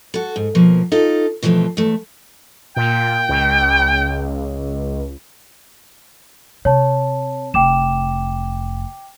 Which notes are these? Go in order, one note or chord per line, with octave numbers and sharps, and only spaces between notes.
F#4 A4
G#2
B2 F3 A#3
D#4 F4 A4
B2 E3 F3 A3 C4
E2 A3
A#2 G5
C#2
C3 C#5 A5
F1 G5 D6 E7